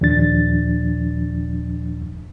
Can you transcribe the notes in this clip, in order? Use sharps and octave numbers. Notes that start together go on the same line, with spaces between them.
D#2 A#2 F3 D4 A6